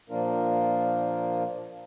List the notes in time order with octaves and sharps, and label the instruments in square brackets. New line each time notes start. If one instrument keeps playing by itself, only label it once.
[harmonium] A#2 F3 A#3 D4 F4 A#4